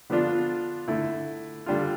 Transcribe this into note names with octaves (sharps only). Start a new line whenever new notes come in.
D3 F3 B3 D4 F4
D3 A3 E4
D3 G3 D4 F4